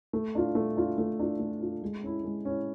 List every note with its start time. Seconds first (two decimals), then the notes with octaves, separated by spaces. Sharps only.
0.13 A3
0.35 D4 F4
0.55 A3
0.77 D4 F4
0.98 A3
1.19 D4 F4
1.40 A3
1.60 D4 F4
1.83 G#3
2.03 C#4 E4
2.24 G#3
2.45 C#4 E4